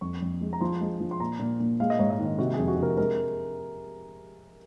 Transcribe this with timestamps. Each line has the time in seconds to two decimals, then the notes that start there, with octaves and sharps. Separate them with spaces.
0.01 F2 C#6
0.22 F2
0.41 G#3
0.53 A#5
0.61 F3 C6
0.81 G#3
1.00 F3
1.11 C6
1.20 A#2 A#5
1.39 A#2
1.60 A#2
1.80 G#3 F5
1.90 D#5
1.99 G#2 C#5
2.10 D#5
2.19 D#3
2.38 C3 F#4
2.54 G#4
2.59 F2
2.68 F#4
2.78 C3 A#4
2.97 G#3 A#4